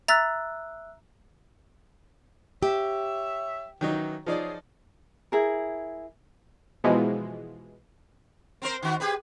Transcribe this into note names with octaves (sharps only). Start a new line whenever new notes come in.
E5 A#5 E6 F#6 A6 B6
G4 C#5 E5
D#3 E3 F#3 C#4 D#4
F3 F#3 D#4 G#4 D5
E4 G#4 A#4
B2 E3 F3 G#3
C4 A#4 C5
D#3 F#4
G4 G#4 B4